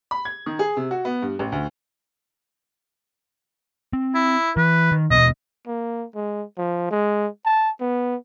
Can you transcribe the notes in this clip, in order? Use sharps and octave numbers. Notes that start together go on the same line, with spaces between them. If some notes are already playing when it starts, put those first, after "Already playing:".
B5
G#6
D#3
G#4
C3
F#4
B3
G2
A1
D2
C4
E4
E3 B4
D#3
D#1 A#1 B2 D#5
A#3
G#3
F3
G#3
A5
B3